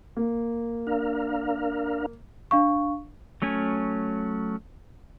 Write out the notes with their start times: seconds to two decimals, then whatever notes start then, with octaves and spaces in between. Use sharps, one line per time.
0.17 A#3
0.87 D4 A#4 F5
2.51 D4 F5 C#6
3.42 F#3 A3 C#4 G#5